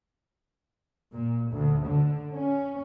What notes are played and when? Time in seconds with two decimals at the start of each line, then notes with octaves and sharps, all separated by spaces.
1.13 A#2
1.53 D2
1.86 D3
2.33 C#4